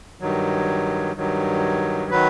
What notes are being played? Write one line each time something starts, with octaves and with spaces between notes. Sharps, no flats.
G2 D#3 F#3
G2 D#3 F#3
D#3 F#3 B4